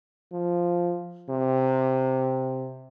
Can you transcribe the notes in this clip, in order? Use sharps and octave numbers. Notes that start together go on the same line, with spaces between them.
F3
C3